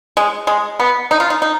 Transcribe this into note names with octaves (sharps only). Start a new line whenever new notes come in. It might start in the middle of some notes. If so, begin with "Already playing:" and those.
G#3
G#3
B3
D#4
F4
D#4
D#4